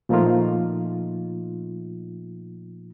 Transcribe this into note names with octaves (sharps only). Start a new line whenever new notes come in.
A#2 F3 A3 A#3 D#4 F4